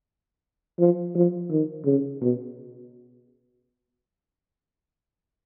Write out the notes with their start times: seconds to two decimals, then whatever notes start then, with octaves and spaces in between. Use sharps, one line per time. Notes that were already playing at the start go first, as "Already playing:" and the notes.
0.79 F3
1.15 F3
1.51 D#3
1.85 C#3
2.21 B2